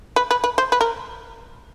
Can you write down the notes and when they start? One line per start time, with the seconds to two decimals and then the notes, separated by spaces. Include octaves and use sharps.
0.16 B4
0.31 B4
0.44 B4
0.58 C5
0.72 B4
0.81 A#4